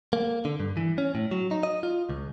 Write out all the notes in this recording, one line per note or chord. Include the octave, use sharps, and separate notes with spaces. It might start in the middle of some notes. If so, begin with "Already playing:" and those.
A#3
D3
G2
E3
C#4
A2
F#3
D#4
D#5
F4
C#2